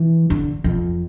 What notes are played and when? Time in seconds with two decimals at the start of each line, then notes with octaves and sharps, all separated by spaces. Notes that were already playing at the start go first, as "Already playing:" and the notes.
Already playing: E3
0.30 D3
0.64 F2